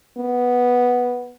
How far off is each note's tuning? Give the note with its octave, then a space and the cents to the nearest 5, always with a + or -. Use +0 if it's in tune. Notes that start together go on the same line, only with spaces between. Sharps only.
B3 -5